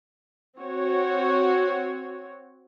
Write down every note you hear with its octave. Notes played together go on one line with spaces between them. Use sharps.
C4 F#4 C#5